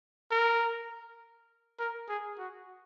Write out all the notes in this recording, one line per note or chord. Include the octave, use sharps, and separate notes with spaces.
A#4
A#4
G#4
F#4